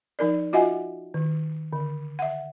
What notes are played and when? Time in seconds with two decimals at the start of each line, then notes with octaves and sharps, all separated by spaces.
0.19 F3 D#4 A#4 D5
0.53 F4 F#4 D#5 E5 F#5 G#5
1.14 D#3
1.73 D3
2.19 E5 F#5